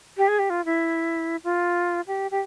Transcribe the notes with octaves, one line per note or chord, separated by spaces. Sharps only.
G4
G#4
G4
F4
E4
F4
G4
G4